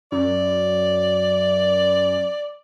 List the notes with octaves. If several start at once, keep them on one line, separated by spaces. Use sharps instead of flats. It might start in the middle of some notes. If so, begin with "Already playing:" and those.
F#2 D5